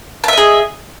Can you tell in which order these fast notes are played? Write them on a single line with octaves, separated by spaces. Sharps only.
A5 E5 D#5 G#4